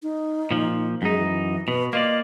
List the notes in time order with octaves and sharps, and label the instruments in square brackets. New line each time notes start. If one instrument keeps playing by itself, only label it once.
[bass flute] D#4
[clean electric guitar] A#2 F3
[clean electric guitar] F#2 D#4 [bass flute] G#3
[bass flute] E3
[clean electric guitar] B2 [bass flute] B4
[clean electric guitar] A#3 F4 D5 [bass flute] D#5